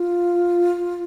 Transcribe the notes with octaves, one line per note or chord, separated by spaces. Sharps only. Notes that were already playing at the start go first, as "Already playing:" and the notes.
Already playing: F4